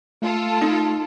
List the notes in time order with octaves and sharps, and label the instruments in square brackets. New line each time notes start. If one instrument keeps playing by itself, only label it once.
[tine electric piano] A3 [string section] F4 A4
[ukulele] D#4